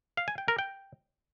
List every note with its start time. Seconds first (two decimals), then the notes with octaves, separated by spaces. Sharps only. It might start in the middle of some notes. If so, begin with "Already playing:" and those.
0.17 F5
0.28 G#5
0.38 G5
0.48 A#4
0.58 G5